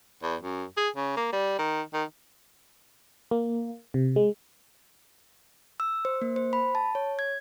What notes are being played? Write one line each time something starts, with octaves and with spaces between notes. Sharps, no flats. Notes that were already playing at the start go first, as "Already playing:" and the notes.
E2
F#2
G#4
C#3
A#3
G3
D#3
D#3
A#3
C3
G#3
E6
C5
A#3
C5
B5
A5
C#5
G#6